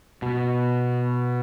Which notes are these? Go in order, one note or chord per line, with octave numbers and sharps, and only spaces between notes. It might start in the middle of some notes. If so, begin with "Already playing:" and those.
B2